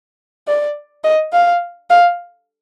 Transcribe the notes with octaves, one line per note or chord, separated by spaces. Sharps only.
D5
D#5
F5
F5